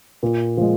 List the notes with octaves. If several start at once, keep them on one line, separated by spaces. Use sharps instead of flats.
A#2
F3 G#3